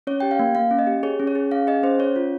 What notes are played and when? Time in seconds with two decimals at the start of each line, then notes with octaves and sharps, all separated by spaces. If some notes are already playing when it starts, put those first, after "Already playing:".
0.07 C#4 C#5
0.20 G4 G5
0.31 F5
0.39 A#3
0.55 A#3 F5
0.71 C#4
0.79 D#5
0.87 G4
1.03 G#4 C#5
1.19 C#4
1.27 C#5
1.35 G#4
1.51 C#4 F5
1.67 G#4 D#5
1.83 C#4 C5
1.99 C#4 C#5
2.16 F4